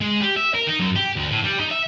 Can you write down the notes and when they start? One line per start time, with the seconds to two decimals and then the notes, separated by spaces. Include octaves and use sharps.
0.01 G#3
0.20 G4
0.36 E5
0.54 A#4
0.67 D#4
0.80 F#2
0.96 G4
1.16 D2
1.31 A2
1.44 G3
1.60 D#4
1.71 E5